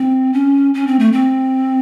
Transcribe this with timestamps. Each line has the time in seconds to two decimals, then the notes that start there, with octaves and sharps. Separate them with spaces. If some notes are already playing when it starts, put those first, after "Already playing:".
Already playing: C4
0.33 C#4
0.74 C#4
0.87 C4
0.99 A3
1.12 C4